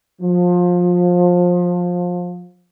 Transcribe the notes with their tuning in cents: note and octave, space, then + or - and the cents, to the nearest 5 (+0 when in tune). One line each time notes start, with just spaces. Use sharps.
F3 +25